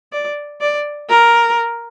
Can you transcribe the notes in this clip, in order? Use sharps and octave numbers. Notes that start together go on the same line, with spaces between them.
D5
D5
A#4